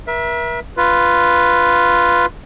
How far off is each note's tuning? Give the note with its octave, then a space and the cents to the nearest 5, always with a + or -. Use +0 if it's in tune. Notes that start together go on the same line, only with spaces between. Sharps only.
A#4 +45 E5 +0
F4 -5 B4 +0